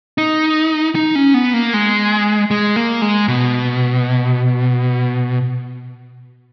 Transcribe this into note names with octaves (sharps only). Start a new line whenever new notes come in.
D#4
D#4
C#4
B3
A#3
G#3
G#3
A#3
G#3
B2